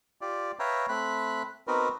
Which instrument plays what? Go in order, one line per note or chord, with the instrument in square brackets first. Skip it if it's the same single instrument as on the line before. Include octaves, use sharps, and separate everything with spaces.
[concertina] F4 G4 D5
B4 C#5 E5 F5 G5 A#5
A3 C4 B5 F#6
B3 C4 D#4 F#4 A#4 B4